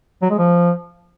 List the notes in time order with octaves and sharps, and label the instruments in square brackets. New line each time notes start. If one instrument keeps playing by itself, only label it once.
[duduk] F#3
G#3
F3